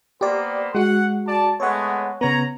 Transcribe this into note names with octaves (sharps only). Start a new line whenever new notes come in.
A#3 B3 G4 C5 D5
G#3 F#4 F#5
D5 A5
G#3 A3 B3 C#5 F#5
C#3 B3 C#5 A#5